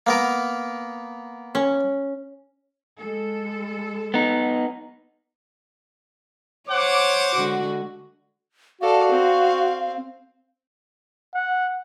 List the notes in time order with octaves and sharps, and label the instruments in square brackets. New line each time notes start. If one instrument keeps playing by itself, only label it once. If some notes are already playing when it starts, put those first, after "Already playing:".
[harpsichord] A#3 B3 A#4
[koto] C#4
[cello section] G#3 A4
[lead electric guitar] B3 D#4
[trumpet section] C5 F#5 D6 [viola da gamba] C#5
[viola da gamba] D3 G#3 F#4
[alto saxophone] F#4 [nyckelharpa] A4 D5 [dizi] F5
[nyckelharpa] C4
[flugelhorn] F#5